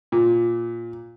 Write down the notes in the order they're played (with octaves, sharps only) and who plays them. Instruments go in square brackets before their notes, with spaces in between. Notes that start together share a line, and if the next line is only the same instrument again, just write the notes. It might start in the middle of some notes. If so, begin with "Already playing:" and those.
[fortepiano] A#2